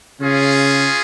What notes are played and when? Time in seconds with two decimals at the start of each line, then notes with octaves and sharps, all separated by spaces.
0.20 C#3 C#4 F4 G#4